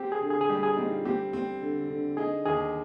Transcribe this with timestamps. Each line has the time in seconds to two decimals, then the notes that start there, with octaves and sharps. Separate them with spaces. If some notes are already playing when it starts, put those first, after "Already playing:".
Already playing: C4 G4
0.12 G#4
0.22 D3
0.31 G#4
0.41 G#4
0.49 G3 G4
0.63 G#4
0.77 C4 D#4
0.91 F4
1.05 C4 G4
1.33 C4
1.62 D3
1.89 D3
2.17 D#4 G#4
2.46 D#2 G#4